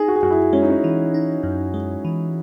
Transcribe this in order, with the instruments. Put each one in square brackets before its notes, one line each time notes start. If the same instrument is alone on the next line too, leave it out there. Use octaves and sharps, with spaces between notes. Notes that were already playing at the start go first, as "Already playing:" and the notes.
Already playing: [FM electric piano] D#4 [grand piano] G#4
[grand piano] F#4
G#4
[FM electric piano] F#2 [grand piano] F#4
[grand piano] E4
[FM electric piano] G#3 [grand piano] C#4
[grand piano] D#4
C#4
[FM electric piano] E3
D#4
F#2
G#3
E3